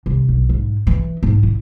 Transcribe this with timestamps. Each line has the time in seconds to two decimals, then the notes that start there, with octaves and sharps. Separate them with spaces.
0.06 C2
0.28 B1
0.49 G#2
0.87 E3
1.23 G#2
1.43 E4